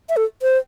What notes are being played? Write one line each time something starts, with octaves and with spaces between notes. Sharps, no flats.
E5
A4
C5